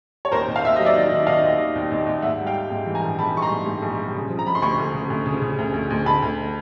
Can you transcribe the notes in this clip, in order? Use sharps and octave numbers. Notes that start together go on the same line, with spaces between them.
C#5
D#2 A#4 C5
D#2
F5
D#2 E5
F#3 D#5
D5 E5
D#3
D#3
D#3 D#5 F5
D#2
D#3
D#2
D#2
D#2
G#2 E5 F#5
G3
F5 G5
G3
G#2
E3
G#5 A#5
A#1
E3 A5 B5
G3 C#6
A#5 C6
G#2
G#2
A#1
G3
C#3
F3
A#5
F3 B5
C6
D2 B5 C#6
D2
C#3
D2
C#3
C#3
D2
D2
D2
D2 A5 B5
D2